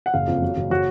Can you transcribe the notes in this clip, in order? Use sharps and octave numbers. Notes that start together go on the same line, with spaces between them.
F#5
F#1 F5
F2
F#3
F#1
F#3 F#4